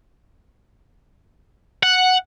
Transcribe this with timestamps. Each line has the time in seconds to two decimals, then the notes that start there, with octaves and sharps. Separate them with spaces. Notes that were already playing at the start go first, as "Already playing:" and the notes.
1.83 F#5